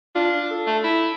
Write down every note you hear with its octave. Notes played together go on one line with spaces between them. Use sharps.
D4 F4
A4
A3
E4